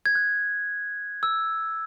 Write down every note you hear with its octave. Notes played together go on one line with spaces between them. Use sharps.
G#6
F#6
E6